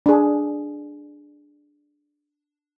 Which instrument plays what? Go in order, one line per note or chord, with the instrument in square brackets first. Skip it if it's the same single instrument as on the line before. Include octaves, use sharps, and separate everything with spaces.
[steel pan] D4 G#4